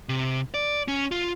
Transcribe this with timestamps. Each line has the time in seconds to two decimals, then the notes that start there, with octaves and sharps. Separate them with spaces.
0.09 C3
0.54 D5
0.88 C#4
1.11 F4